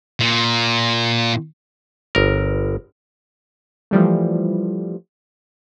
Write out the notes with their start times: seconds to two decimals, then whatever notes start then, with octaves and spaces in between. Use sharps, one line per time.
0.20 A#2
2.15 G1 A#4
3.91 E3 F3 G3 A3